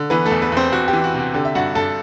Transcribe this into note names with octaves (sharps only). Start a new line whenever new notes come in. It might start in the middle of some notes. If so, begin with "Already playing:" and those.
Already playing: D3
E3 B3 B4
A3 A4
E2
B3 B4
E2 C4 C5
E2 F#4
G4
E3
F#4
C3 F#4
D3 G4
E5
G2 F#4 F#5
G2 A4 A5